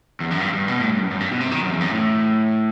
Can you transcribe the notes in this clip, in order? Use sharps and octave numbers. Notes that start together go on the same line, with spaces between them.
E2
F#2
G2
G2
B2
A2
G2
F#2
F#2
G2
B2
C3
D#3
F#2
E2
F#2
A2